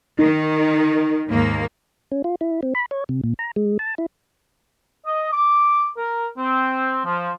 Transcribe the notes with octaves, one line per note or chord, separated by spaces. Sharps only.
D#3 D#4
D#2 G#2 A#3
C#4
F4
E4
C4
B5
C#5
C3
A#2
A#5
G#3
A5
E4
D#5
D6
A#4
C4
F3